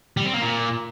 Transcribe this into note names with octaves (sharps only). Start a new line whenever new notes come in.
G3
C4
A#3
A#2